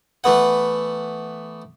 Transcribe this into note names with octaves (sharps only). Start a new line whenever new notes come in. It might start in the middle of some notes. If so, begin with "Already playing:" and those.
E3 A3 B3 F#5